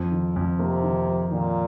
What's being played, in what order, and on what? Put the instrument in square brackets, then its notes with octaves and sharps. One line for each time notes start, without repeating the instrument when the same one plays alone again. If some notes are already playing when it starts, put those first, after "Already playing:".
Already playing: [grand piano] F2
D#3
F2
[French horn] C3 [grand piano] A#3
[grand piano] D#3
F2
[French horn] A#2 [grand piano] D#3